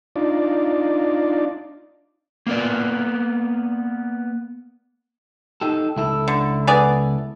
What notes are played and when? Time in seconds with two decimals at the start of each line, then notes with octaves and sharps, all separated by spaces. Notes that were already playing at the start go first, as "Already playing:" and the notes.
0.16 D4 D#4 F4 D5
2.47 A#3 B3 A#4 D5
5.61 D#4 G4 A4
5.96 C#2 E4 A4
6.28 D3
6.67 B3 G#4 D5